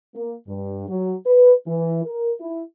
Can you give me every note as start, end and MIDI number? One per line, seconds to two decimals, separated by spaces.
0.15 0.35 58
0.48 0.86 43
0.89 1.16 54
1.26 1.53 71
1.68 2.02 52
2.05 2.32 70
2.40 2.61 64